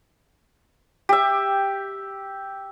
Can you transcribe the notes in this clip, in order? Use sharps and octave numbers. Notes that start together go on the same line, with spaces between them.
G4 E5